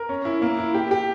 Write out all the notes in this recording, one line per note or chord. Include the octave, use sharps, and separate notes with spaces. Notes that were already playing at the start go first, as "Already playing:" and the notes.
Already playing: A#4
C#4
E4
A#3
E4
G4
G4